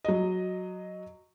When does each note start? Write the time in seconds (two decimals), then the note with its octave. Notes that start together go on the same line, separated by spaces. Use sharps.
0.05 F#3 D#5